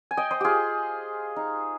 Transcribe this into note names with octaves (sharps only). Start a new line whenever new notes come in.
G#5
D#5 G5
C5 D#5
F4 G4 G#4
D#4